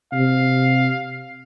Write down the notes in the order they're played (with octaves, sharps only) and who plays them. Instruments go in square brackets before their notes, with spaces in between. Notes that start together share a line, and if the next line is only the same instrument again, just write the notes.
[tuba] C3 [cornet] F5